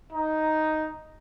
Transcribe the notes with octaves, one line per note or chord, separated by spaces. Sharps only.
D#4